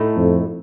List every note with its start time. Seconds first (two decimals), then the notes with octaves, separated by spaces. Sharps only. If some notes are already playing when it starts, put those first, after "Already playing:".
Already playing: A2 A3 D#4
0.16 F2